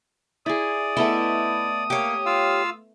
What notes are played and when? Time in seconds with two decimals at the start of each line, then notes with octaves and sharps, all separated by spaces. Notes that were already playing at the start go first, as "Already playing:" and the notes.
0.46 E4 G#4 D5 D#6
0.97 A3 B3 E4 D#5
1.90 A#3 G4 C#5
2.26 F4 F5 E6